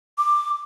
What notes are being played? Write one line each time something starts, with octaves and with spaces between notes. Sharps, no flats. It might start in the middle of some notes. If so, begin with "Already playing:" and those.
D6